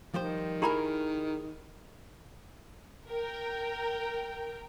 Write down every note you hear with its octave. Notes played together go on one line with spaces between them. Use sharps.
D#3 F3 G3 C5
E4 G4 G#4 A#4 A#5 B5
A#4 G5